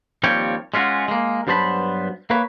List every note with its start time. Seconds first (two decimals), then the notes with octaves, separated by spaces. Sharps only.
0.23 D#2 F3 G3 C4 C#5 G5
0.74 G#3 C#4 F4 F#4
1.08 G#3 A#3
1.47 G2 F#3 B3 C5 A5 B5
2.30 A#3 B4 C#5